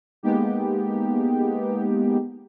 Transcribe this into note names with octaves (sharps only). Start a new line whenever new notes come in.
G#3 A#3 B3 D#4 G4